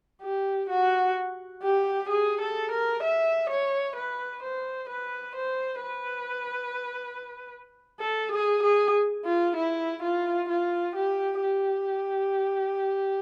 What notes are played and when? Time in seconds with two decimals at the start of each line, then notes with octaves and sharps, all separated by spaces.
0.22 G4
0.69 F#4
1.63 G4
2.09 G#4
2.41 A4
2.71 A#4
3.03 E5
3.49 C#5
3.96 B4
4.42 C5
4.89 B4
5.35 C5
5.83 B4
8.00 A4
8.31 G#4
8.63 G#4
9.24 F4
9.56 E4
10.02 F4
10.49 F4
10.95 G4
11.42 G4